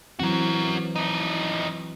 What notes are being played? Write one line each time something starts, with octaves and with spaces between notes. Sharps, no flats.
E3 F#3 C4 F#4 A#4
F2 D#4